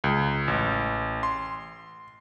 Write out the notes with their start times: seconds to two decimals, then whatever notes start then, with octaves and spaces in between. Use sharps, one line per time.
0.04 C#2
0.48 A1
1.23 C6